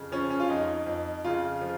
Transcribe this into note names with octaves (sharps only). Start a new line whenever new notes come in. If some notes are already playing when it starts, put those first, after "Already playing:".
Already playing: F2 C#3
F3 C#4
C#4
F4
F2 D#4
F2
C#3 F4
F3